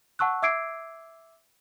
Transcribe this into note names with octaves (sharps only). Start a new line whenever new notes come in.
F#5 A5 C#6 E6 F#6
E5 D6 E6 G#6 C7 D7